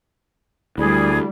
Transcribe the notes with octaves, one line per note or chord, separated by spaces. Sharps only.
D2 G3 E4 G#4 D5